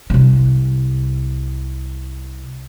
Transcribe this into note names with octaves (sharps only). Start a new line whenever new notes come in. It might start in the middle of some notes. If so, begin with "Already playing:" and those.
C2 C3